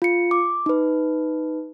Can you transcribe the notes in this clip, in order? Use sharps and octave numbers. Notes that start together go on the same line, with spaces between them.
F4 C#7
D6
D#4 B4